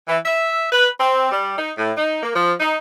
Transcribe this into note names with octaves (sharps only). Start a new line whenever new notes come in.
E3
E5
B4
C4
G3
D#4
A2
D#4
A#3
F3
D#4